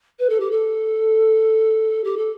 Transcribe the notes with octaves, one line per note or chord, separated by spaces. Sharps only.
B4
A4
G4
A4
G4
A4